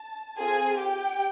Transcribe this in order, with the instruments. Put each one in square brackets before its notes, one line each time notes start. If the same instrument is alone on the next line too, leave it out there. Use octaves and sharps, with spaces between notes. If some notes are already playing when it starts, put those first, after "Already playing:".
Already playing: [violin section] A5
C4 F4 G#4 A4 G#5
G4 G5